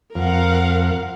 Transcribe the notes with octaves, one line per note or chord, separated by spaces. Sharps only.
F2 A#4 F5 F#5